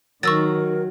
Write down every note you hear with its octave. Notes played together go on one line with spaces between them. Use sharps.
D#3 F#3 A#4 C#6 E6 A6